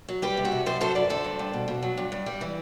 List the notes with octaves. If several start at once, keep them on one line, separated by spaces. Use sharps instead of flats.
F#3
G3 G4 B4
C3
F#4 A4
C3
F#2 A4 C5
F#3 A4 C5
F#2 B4 D5
D3 A4 C5
G2
G2
B2
B2
F#3
G2
G2
G3
E3